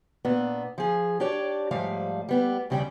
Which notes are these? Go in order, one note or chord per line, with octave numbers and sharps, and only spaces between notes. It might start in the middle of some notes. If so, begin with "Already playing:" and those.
A#2 B3 D4
F3 G#4
D4 G4 C#5 D5
G#2 F3 G3 A3 F5
G3 B3 G4
D#2 C#3 G3 G4 D5 G5